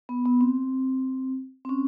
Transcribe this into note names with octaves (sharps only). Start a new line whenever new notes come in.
B3
B3
C4
C4
C#4